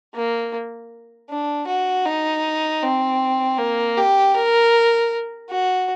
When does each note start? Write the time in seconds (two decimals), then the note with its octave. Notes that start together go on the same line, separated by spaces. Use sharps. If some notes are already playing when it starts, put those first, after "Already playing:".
0.14 A#3
1.30 D4
1.67 F#4
2.06 D#4
2.83 C4
3.58 A#3
3.97 G4
4.35 A#4
5.50 F#4